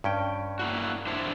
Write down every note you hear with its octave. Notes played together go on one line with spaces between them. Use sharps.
G2 C#4 G5
A#3 E4 F#4
D4 E4 C5